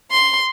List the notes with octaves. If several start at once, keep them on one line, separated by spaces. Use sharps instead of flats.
C6